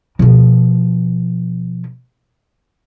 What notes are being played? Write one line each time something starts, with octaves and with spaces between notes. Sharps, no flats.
B2 F3